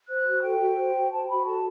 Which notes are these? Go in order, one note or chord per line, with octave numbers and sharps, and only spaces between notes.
C5 F#6
F#4
A4 G5
F#4
C5
F#4
C5 A5
F#4 B5
A4 A5